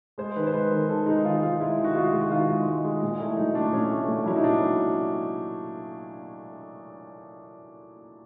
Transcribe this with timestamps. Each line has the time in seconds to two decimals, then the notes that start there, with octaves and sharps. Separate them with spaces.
0.18 G#3 C5
0.36 D#3 B4
0.47 C5
0.53 G#3 B4
0.71 D#3 A#4
0.89 D#3 A4
1.06 G#3 D#4
1.25 D#3 F4
1.42 G#3 F4
1.60 G#3 E4
1.78 D#3
1.84 F#4
1.95 G#3 F4
2.13 G#3
2.21 F#4
2.31 D#3 F4
2.48 G#3
2.66 G#3
2.85 G#3
3.02 A#2
3.20 A3 E4
3.37 F#3 D#4
3.54 A3 D4
3.72 A#2 C#4
3.91 A3
4.09 A#2
4.26 F#3 E4
4.36 D#4
4.44 A#2 D4
4.61 F#3